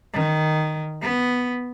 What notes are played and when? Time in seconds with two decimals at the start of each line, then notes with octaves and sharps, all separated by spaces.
0.13 D#3
1.02 B3